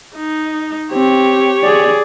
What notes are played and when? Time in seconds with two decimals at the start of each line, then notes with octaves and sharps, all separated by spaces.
0.16 D#4
0.92 C4 G4 C#5
1.64 G#4 D5